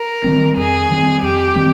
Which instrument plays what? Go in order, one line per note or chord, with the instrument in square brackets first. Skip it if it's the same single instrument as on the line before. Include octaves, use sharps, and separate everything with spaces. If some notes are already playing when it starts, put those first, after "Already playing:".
Already playing: [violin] A#4
[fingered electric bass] D#3 G3 C4
[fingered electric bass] F2 [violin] G#4
[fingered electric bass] D#3 G3 C4
[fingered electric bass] F2 [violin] G4
[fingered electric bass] D#3 G3 C4